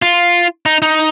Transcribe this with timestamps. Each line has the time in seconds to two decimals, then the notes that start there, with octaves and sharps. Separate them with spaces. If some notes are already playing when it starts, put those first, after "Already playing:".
0.02 F4
0.66 D#4
0.82 D#4